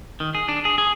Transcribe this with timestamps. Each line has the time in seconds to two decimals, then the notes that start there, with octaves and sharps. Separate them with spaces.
0.20 D#3
0.35 G#4
0.48 D4
0.65 G#4
0.78 G#4